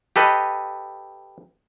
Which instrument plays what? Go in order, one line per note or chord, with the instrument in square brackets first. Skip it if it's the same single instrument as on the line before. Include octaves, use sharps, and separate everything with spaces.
[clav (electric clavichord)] G4 A4 B4 D#5